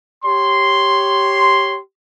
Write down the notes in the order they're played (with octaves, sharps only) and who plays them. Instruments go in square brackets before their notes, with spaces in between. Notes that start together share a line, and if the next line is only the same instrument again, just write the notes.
[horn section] G4 C#5 C6